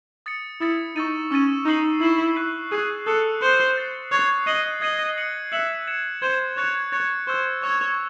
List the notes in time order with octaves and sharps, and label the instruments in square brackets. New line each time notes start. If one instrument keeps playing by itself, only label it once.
[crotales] D#6 A6 C#7
[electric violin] E4 [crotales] D#6 A6 C#7
[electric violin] D#4 [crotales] C#6 E6 A6 D#7
[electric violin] C#4 [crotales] C#6 E6 A6 D#7
[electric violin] D#4 [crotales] C#6 E6 C7 F#7
[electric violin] E4 [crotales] C#6 E6 C7 F#7
[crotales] C#6 F#6 C7 D#7
[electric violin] G#4 [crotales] C#6 F#6 C7 D#7
[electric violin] A4 [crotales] D#6 F#6 C#7
[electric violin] C5 [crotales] D#6 F#6 C#7
[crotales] F#6 A6 C7
[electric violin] C#5 [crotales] F#6 A6 C7
[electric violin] D#5 [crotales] G#6 C7 D#7 F#7
[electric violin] D#5 [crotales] G#6 C7 D#7 F#7
[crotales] F#6 C#7 F#7
[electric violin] E5 [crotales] F#6 C#7 F#7
[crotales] G#6 C#7 E7
[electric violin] C5 [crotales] G#6 C#7 E7
[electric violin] C#5 [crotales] F#6 A6 C#7
[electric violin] C#5 [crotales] F#6 A6 C#7
[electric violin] C5 [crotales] C#6 E6 G#6
[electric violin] C#5 [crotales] C#6 E6 G#6